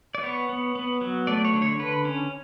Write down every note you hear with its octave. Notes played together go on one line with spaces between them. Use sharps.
D5
B3 C#5
B3
B3
F#3
A3 D5
C#5
D3
C#5
D3 B4
C#4